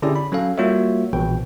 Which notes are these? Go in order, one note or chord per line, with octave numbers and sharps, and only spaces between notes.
D3 C#4 E4 G4 G#4 D5
B5
F#3 C#4 A4 F5
G3 A#3 F4 F#4 C#5 E5
A#1 B2 E3 G5